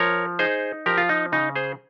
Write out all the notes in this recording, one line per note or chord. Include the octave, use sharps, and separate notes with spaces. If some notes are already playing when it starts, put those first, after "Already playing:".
Already playing: F3 A#4 C#5
D#4 G#4 C5
F3 G4 A#4
F4
D#4
C#3 D#4
G#4 C5